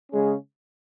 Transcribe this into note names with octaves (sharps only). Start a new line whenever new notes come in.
C#3 G#3 C#4 G#4